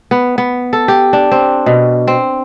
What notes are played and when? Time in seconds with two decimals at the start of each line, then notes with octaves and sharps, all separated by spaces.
0.11 B3
0.38 B3
0.73 A4
0.88 G4
1.13 D4
1.32 C4
1.66 B2
2.08 C4